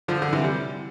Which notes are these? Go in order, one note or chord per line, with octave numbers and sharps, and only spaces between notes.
D3 F3
D3
C3 E3
G3